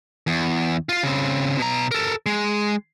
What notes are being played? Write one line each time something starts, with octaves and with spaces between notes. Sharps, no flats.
E2
F4 F5
C#3 C4
B2 A#5
A4 A#4
G#3